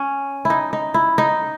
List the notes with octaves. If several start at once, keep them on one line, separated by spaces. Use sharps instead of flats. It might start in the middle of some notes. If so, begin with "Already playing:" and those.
Already playing: C#4
E4
D#4
D#4
E4
D#4